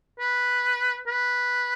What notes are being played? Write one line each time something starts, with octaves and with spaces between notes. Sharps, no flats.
B4
B4